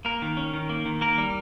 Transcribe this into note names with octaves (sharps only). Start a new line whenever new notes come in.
A#3 A#4
D#3
C#4
D#3
A#3
D#3
A#3 A#4
G3